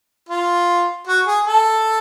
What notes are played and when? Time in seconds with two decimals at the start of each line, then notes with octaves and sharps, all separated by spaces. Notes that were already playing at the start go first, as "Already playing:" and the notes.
0.29 F4
1.07 F#4
1.26 G#4
1.47 A4